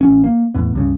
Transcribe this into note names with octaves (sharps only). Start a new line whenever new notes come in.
A1 C#4
A#3
E2 A2 B3
C#2 G2 C#3